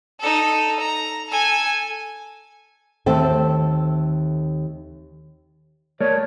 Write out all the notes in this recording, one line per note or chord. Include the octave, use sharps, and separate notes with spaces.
D#4 A4
A#5
A4 G#5
D#2 A3 C4 A4
A3 A#4 C#5 D5